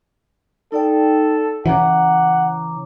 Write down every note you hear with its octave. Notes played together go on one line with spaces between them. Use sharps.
D#4 A4 D5 G5
C#3 E3 C#5 F#5 A#5 D6